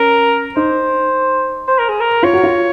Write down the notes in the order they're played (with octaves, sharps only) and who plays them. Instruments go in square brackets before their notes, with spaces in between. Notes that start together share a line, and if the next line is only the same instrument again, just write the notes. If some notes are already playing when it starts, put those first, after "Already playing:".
Already playing: [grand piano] C#4 [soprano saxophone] A#4
[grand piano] D#4 [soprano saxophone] C5
[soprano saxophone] C5
A#4
G#4
A#4
[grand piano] F4 [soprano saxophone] C#5
[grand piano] F#4
F4